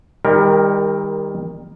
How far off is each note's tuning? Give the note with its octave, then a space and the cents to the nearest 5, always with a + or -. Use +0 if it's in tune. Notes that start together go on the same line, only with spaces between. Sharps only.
D#3 +10 G3 +35 A#4 +0